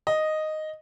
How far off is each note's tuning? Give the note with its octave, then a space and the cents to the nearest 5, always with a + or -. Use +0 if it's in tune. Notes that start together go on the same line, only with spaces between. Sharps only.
D#5 -5